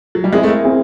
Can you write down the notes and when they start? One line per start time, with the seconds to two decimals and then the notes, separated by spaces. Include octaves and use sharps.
0.15 F#3
0.24 G3
0.33 G#3 C4 E4 G#4
0.43 A3
0.48 A#3
0.64 C4 E4 G#4